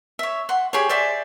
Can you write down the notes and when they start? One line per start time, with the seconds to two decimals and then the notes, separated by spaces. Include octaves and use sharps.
0.19 C#5 E5
0.49 F#5 C6
0.73 G4 G#4 C5 C#5
0.89 C5 D5 E5 G#5